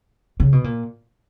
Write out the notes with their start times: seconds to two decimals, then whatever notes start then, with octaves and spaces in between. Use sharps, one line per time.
0.40 C#3
0.53 B2
0.64 A#2